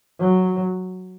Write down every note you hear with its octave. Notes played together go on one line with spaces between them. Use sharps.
F#3